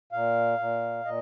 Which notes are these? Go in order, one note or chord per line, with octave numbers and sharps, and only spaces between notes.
A#2 F5
A#2
A#2 D#5